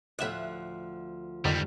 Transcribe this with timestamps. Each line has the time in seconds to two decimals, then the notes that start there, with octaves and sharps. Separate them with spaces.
0.19 D2 A2 F3 E5 F#6
1.45 F2 G#2 D3 D#3 G3